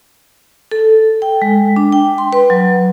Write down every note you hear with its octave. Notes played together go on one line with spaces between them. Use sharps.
A4
G5
G#3
D4
G5
C6
B4
F#3